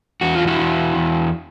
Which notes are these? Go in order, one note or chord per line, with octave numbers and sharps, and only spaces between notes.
E2 F#4
F4
E4 F#4
E2
E2